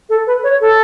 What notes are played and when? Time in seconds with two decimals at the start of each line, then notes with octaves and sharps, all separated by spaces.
0.09 A4
0.27 B4
0.43 C#5
0.61 A4